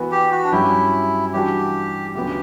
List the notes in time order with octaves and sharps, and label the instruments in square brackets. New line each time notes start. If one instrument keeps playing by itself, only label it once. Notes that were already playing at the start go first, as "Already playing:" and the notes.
Already playing: [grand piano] E3 B3 F#4 B4
[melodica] G4
F#4
D4
[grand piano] G2 F#3 C#4 G4 [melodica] E4
[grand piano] E3 G3 D4 F#4 [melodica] G4
[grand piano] D2 C#3 F#3 B3 [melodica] G4